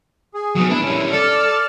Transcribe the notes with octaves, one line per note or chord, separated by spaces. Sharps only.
G#4
F#3 B3
D4 E4
G3 C#4
A4 D5 F6